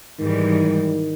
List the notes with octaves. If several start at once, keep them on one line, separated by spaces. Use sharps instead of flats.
G#2 D#3 E3 G3